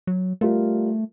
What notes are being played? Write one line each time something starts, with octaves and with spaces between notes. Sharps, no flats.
F#3
G3 A3 F4 A#4